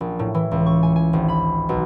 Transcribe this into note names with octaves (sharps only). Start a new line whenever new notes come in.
A#1
A2
E3
C#2
C#6
G#5
G#5
G#1
B5
B1